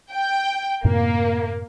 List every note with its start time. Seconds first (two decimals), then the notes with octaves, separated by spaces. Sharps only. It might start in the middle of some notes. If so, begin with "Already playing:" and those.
0.12 G5
0.85 F#2 A2 C3 A#3